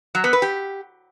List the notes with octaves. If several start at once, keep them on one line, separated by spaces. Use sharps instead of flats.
F#3
B3
B4
G4